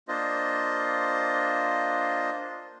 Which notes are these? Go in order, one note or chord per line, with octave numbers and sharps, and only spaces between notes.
A#3 D4 F4 C5 D#5